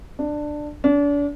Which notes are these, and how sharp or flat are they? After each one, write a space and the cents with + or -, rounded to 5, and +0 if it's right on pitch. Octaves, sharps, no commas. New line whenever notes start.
D4 +15
D4 -35